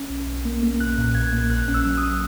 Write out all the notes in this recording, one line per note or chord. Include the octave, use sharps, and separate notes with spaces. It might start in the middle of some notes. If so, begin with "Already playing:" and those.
Already playing: C#4
B1
B1
A#3
A#3
B1 F#6
A#2
B1 G#6
A#3
A#1 F#6
C#4
E6
F#3
D#6